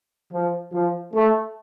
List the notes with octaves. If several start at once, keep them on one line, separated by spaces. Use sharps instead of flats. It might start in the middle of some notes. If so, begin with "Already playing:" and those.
F3
F3
A3